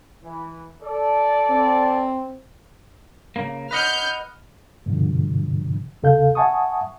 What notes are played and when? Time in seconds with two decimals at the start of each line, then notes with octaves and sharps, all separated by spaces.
0.23 E3
0.83 A4 D5
1.50 C4
3.36 C#3 A#3
3.71 B4 D#5 F#5 F6 G6
4.86 G2 B2 D3 F3
6.03 D#2 C#3 A4 F5 G6
6.35 E5 F#5 G#5 A5 C#6 D#6